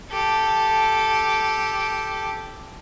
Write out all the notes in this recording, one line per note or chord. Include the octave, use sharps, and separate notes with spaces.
G4 A4